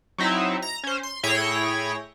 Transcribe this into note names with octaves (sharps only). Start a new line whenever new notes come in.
F#3 C4 D#4 E4 E5
A#5 A#6
C#4 C5
C6
A2 E4 G#4 C#5 G5 A#6